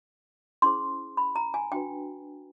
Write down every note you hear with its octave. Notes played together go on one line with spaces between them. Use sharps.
C#4 E4 G#4 C5 C6
B5
A#5
G#5
D4 F#4 B4 G5